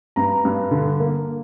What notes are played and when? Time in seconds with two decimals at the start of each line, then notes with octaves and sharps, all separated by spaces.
0.16 G2 A#5
0.45 G2
0.71 D3
1.00 A#3